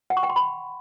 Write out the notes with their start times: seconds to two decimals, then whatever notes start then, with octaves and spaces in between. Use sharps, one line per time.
0.10 F#5
0.17 C#6
0.23 G5
0.30 C6
0.36 B5